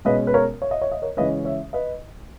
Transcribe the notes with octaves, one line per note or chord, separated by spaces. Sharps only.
B2 G#3 C#4 B4 D#5
B4
A#4 C#5
C#5
D#5
C#5
D#5
A#4 C#5
C#3 E3 G#3 C#4 B4 D#5
C#5 E5
B4 D#5